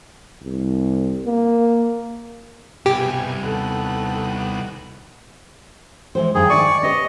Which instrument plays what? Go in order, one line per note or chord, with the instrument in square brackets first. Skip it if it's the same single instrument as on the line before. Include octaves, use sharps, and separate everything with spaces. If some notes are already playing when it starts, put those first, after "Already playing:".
[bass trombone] C2
A#3
[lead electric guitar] C2 [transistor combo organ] G2 B2 G#5 [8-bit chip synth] G4
[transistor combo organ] D#2 B3 F#5 [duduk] A4
[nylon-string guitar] E3 G#3 C5
[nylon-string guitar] G2 D#3 [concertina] G#4
[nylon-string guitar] D#3 E5 G#5 [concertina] D5 C#6
[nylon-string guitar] C#4 G4 B4 [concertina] D#5